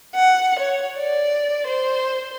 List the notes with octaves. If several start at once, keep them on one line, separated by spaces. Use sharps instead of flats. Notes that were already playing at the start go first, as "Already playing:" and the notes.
F#5
C#5
D5
C5